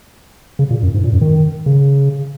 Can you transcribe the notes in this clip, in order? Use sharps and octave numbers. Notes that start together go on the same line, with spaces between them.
C#3
A#2
F#2
G#2
A#2
F#2
D#3
C#3